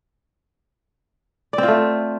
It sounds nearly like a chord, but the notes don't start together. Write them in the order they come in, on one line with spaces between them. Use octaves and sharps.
D5 C4 F4 A3